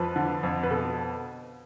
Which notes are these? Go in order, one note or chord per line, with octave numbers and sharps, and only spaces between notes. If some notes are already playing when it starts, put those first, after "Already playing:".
Already playing: F2 F3 B4
D3
F2
B4
B2 A4